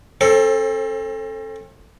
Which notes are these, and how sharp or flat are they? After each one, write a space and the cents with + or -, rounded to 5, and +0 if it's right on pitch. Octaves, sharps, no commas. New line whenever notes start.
C4 +45 A4 +0 C5 +25